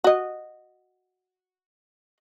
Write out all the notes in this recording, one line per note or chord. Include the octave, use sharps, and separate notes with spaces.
F#4 D#5